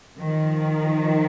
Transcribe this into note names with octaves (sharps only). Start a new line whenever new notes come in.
D#3 F3